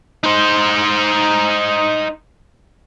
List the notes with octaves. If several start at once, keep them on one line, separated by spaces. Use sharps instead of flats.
D#4 C5